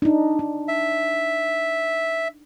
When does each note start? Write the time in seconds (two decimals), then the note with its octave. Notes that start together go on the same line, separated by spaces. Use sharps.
0.02 D4 D#4
0.39 D#4
0.68 E5